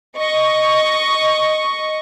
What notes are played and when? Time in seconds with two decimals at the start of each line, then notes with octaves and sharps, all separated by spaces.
0.17 D#5 C#6